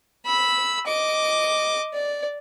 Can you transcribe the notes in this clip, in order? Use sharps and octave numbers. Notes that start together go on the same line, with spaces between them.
B5 E6
D#5 D6
D5